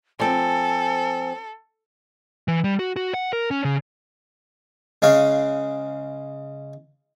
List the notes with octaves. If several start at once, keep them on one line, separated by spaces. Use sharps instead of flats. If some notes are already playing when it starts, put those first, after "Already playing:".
F3 C4 A4 G#5
E3
G3
F#4
F#4
F#5
A#4
C#4
C#3
C#3 G#3 C#5 F5